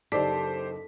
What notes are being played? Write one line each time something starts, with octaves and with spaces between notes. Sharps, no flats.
F#1 D#4 G4 A4 C5 D5 D6 B6